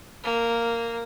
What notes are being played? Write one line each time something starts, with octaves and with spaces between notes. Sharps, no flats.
A#3